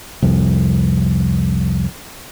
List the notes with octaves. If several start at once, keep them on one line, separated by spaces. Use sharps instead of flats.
C2 F2